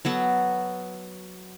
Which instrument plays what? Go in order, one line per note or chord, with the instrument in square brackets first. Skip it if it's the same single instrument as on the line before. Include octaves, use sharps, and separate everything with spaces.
[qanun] F#3 B3 F#4 A4